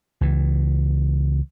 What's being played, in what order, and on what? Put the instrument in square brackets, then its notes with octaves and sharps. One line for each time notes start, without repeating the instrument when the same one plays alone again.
[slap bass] C#2 E3